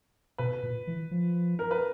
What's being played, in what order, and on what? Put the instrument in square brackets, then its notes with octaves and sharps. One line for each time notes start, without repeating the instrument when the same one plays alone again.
[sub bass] B2 [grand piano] B4
[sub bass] A#2
E3
F3
[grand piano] A#4
B4